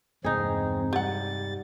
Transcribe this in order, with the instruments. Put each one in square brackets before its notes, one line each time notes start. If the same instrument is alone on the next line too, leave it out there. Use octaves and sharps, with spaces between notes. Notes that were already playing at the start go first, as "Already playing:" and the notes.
[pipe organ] E2 C4 [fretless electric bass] G2 C3 G#3 [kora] D#4 G#4
[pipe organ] G3 A6 [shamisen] G4 F#5